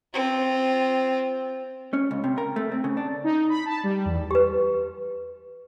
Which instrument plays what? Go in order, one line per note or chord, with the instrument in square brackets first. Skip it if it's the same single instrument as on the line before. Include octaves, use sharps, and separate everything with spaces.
[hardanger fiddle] C4 F4
[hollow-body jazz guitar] C#4
C#2
C3
A#4
A3
C4
C#3
D4
[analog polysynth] D#4
B5
A5
G3
E2
[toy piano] G4 B4